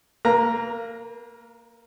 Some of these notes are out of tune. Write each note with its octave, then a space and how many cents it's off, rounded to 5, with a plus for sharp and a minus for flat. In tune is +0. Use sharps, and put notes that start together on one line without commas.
A#3 -20 A#4 +45 A#5 +0